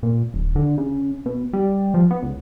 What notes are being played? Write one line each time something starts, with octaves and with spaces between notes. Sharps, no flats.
A#2
D1
D3
C#3
B2
G3
F3
B3
C#2